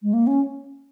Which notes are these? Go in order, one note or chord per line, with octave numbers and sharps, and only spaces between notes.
G#3
A#3
C#4